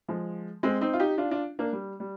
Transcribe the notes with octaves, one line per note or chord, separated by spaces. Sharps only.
F3 G#3
G#3 C4
C4 D#4
F4
D#4 G4
D4 F4
D4 F4
A#3 D4
G3
G3